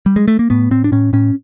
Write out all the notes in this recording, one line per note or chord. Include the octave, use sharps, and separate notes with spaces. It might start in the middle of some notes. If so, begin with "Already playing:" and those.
G3
G#3
A3
A#3
A2 B3
A2 C4
D4
A2 C#4
A2 C#4